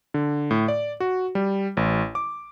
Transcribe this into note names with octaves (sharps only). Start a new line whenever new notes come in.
D3
A2
D5
F#4
G3
A1
D6